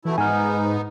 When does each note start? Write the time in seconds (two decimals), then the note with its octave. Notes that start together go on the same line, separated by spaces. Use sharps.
0.05 B2 E3 A3 E4
0.18 G#2 B3 D#4 G#5 F6